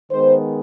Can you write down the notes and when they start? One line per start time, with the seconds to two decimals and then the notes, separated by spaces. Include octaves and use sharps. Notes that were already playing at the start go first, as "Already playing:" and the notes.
0.11 D#3 G#3 B3 C5